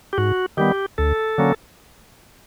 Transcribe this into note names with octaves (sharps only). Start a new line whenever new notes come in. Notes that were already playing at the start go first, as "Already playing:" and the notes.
G4
G#2 F#4
D#3 G3 B3 G4
D2 A4
D3 F#3 A#3 C#4